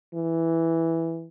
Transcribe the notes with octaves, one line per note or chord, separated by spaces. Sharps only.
E3